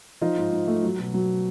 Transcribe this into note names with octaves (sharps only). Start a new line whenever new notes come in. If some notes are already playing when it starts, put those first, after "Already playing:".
F3 D#4 F4
G#2
G#2
A3
F#3
B2
F#3